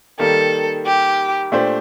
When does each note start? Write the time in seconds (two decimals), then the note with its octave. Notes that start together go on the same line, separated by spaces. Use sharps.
0.19 D#3 G3 A#3 A4
0.86 G4
1.52 A#2 A3 D4 G4 C5